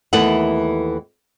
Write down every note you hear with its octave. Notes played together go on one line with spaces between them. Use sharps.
D#2 E3 A3 B3 E4 F#5